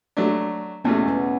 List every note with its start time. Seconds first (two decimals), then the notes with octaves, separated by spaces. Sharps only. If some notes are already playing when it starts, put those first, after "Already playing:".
0.17 F#3 A3 D4
0.85 E2 B2 A3 C#4
1.08 B3